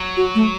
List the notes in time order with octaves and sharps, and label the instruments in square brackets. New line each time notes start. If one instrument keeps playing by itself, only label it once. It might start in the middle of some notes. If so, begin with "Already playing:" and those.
Already playing: [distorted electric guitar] F#3
[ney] F#4
A3